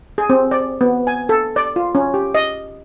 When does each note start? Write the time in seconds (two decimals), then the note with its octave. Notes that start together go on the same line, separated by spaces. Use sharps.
0.18 G#4
0.30 C4
0.51 D5
0.81 B3
1.07 G#5
1.29 A4
1.56 D5
1.76 F4
1.95 C#4
2.14 G4
2.35 D#5